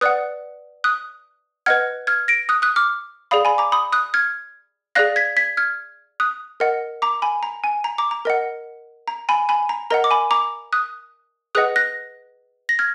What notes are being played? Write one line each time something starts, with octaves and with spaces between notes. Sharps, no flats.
B4 D5 F#5 D#6 F#6
D#6 F#6
B4 D#5 F#5 F6 G#6
F6 G#6
A#6 D7
D#6 F#6
D#6 F#6
D6 F6
G#4 D5 F5 B5 D#6
G#5 B5
A#5 D6
B5 D#6
D#6 F#6
F6 G#6
G#4 D5 F5 F#6 A#6
G#6 B6
G#6 B6
F6 G#6
D#6 F#6
A#4 D#5 F#5
A#5 D6
G#5 B5
A#5
G#5
A#5
A#5 D6
A#5
A#4 D#5 F#5
A#5
G#5 B5
G#5 B5
A#5
A#4 D#5 F#5 A#5
D6
G#5 B5
A#5 D6
D#6 F#6
G#4 B4 D#5 F#5 D#6 F#6
F#6 A#6
A#6
F6 G#6